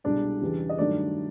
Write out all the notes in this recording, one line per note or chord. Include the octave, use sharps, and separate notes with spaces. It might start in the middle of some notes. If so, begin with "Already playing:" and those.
C2 B2 G#3 D4 D5
E2 C#3 E3 G3
D#5
G2 D#3 F#3 A3 D4 D5